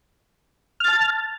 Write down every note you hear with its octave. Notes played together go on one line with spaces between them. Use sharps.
A5 F6 A6